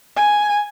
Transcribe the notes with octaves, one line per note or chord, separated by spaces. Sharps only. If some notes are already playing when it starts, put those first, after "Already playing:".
G#5